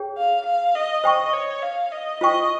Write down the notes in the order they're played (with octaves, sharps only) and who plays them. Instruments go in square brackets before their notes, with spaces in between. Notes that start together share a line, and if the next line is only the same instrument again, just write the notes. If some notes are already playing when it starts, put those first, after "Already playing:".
Already playing: [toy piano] G#4 C#5 G5
[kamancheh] F5
F5
D#5
[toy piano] C5 G5 C#6 [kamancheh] D#5
[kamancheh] C#5
F5
D#5
[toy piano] F4 C5 G5 C#6 [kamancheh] D#5